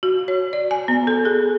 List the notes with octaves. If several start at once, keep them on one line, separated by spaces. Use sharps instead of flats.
F#4
C#5
D5
G#5
B3
A4
G#4